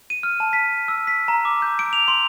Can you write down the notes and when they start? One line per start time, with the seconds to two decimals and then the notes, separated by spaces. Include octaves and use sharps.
0.10 D#7
0.23 F6
0.40 A5
0.53 B6
0.88 E6
1.07 B6
1.28 A#5
1.45 D6
1.62 G6
1.79 D7
1.93 F7
2.08 C6